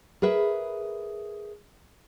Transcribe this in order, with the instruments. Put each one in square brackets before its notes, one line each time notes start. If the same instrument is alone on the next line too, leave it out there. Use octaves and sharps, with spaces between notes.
[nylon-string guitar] G#4 A#4 B4 E5